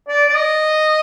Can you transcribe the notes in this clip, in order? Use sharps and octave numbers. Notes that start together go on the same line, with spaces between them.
D5
D5
D#5